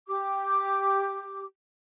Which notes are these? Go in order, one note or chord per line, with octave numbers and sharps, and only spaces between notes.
G4 D6